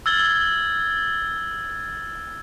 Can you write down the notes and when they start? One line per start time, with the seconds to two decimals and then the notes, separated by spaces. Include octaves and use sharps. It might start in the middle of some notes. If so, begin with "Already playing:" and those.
0.06 E6 F6 G#6 A6 G7